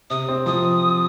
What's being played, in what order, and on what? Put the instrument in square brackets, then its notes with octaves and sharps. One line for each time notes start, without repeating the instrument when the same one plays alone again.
[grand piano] C3 [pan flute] D#6
[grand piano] C4
[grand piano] F3 [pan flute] D#6